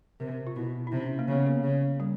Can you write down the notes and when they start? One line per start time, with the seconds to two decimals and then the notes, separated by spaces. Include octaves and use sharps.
0.20 C3 A#4
0.47 F4
0.56 B2 E4
0.87 E4
0.91 C3 D#4
1.00 C#4
1.19 A#3
1.28 C#3 B3
1.46 A#3
1.64 C#3
2.00 G3